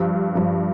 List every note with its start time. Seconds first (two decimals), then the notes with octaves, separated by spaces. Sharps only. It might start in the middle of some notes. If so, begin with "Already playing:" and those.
Already playing: G2 F3
0.35 G2 F3